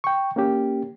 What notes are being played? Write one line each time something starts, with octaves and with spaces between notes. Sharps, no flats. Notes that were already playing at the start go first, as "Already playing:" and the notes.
G5 C#6
A#3 C#4 G4